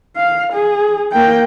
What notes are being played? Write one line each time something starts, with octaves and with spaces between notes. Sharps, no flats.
F5
G#4
A#3 G5